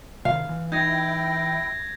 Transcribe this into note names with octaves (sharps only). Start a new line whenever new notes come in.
C3 D#3 F5
E3
D#4 E4 G5 G6 G#6 A#6